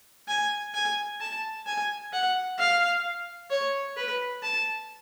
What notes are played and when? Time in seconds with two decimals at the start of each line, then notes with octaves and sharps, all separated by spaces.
0.28 G#5
0.74 G#5
1.21 A5
1.66 G#5
2.13 F#5
2.58 F5
3.50 C#5
3.97 B4
4.43 A5